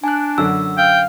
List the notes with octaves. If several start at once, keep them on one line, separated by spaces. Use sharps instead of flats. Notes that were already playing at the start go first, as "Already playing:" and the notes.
D4 G#5 F#6
F#2 D3 E6
F5 G5